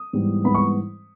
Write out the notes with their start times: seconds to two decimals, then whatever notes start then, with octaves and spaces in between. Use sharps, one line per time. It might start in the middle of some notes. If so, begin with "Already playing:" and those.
Already playing: D#6
0.13 G#2 E3 G3 B3
0.44 G#2 E3 G3 B3 B5
0.55 C#6